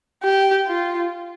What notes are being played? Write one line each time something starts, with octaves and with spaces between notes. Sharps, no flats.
G4
F4